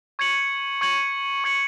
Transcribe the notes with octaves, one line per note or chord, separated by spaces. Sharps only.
C#6 G#6 C#7 F#7
C#6 G#6 C#7 F#7
C#6 G#6 C#7 F#7